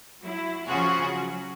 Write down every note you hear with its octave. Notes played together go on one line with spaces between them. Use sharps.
F#3 E4
C#3 F3 C#4 F4 F#4 G#4
F#3